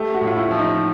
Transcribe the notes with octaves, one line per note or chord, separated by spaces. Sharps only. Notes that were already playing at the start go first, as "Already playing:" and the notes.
Already playing: A3 G4
F#4
A2
F4
E4
F3
D#4